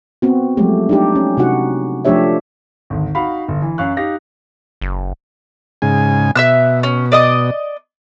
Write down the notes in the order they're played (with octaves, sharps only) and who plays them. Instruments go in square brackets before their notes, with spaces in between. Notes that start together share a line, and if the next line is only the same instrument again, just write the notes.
[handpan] B3 C4 F#4
F3 F#3 G#3 A3 G4
D4 D#4 G4
C#4
C3 D#4 F#4 F#5
F3 A3 D4 G4 C#5 E5
[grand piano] G#1 D2
D#4 F#4 F5 F#5 B5
G1
E3
F#2 F5 C#6 F#6
D#4 G4 F5 A#6
[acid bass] F#1
[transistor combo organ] G#2 C#3 G#5
[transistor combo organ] B2 [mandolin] E5 E6 F#6
[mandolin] C#4
D5 D#5 D#6